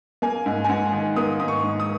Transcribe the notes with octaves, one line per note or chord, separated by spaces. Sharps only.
A#3 G#5
G#2
G#5
G#2 F#5
D#3
A#3 D#6
G#2 D#6
C#6
G#2
D#6